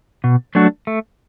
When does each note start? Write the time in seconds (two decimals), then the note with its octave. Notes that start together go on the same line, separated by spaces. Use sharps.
0.24 B2
0.55 F#3 A3 D4 F#4
0.87 A3